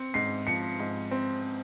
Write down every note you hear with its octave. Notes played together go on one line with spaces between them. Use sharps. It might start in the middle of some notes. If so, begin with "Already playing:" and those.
Already playing: C4 C#7
G#2 C7
F3 C#7
G#2
C4